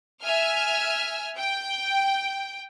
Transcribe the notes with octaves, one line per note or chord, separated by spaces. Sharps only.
E5 G#5 F6
G5